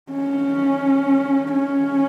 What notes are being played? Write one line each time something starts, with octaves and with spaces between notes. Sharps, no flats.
C#4
C#4